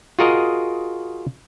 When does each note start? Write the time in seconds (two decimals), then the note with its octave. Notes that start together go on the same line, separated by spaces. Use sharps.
0.19 F4 F#4 G#4 A#4 D#5